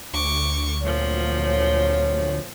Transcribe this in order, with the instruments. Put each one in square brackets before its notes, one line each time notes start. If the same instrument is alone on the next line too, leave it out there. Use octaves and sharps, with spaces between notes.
[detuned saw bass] D2 [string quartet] C#6 D6
[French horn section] F2 F#3 C#5 [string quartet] A#2 F3